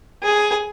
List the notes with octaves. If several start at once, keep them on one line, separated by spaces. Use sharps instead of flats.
G#4